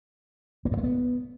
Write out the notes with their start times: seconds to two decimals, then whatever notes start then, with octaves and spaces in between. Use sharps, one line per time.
0.65 A#3
0.71 G2
0.77 A3
0.84 B3